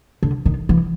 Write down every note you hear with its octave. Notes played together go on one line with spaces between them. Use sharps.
D3
D#3
E3